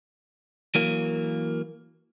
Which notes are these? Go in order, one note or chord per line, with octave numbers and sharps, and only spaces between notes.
E3 F#3 A#3